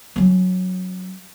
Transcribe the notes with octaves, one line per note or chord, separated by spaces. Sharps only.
F#3 C#4